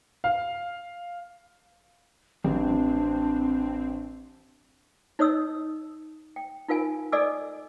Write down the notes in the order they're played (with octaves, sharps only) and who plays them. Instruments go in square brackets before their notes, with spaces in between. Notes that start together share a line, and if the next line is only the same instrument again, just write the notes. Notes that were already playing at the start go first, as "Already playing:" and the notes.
[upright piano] F5
[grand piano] A1 [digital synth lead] C4 [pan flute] D4
[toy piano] D#4 C#5 D#5 D#6 E6
G5
D#4 F4 A#4 F5 G#5
A4 D5 D#5 G#5 D6 E6